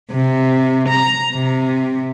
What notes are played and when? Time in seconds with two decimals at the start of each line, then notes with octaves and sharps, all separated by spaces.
0.11 C3
0.90 A#5
1.32 C3